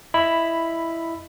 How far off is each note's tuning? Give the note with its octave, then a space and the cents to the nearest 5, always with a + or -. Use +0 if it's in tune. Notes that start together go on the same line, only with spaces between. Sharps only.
E4 +5 D#5 +0 B5 +0